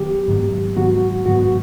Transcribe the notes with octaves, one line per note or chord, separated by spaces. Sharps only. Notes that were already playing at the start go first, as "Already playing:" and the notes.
Already playing: D#3 F#3 B3 G4
G#2 D#3 F#3 B3
G#2 D#3 F#3 B3 F#4
G#2 D#3 F#3 B3 F#4